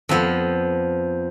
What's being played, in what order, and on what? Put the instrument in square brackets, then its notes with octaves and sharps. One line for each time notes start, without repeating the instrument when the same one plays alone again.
[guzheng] F2 F3 B3